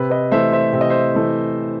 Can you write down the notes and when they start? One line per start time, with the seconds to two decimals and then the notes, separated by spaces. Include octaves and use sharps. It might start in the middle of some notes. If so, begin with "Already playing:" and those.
Already playing: C3 B4
0.10 B4 D#5
0.31 E3 A3 C5 E5
0.52 C5 E5
0.73 C3 E5
0.81 D#5
0.90 C5 E5
1.15 E3 A3